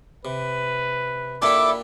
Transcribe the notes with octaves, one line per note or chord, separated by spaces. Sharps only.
C3 B4
A#2 D4 E4 G4 A4 D6